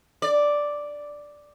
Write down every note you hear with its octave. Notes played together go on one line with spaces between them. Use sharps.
D5